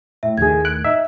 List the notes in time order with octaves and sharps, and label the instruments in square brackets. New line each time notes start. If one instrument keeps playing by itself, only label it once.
[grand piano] A2 [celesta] E5
[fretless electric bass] D#2 A2 D#3 [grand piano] A3 G#4 [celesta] G#6
[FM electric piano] F#6 [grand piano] D7
[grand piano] D#4 [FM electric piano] E5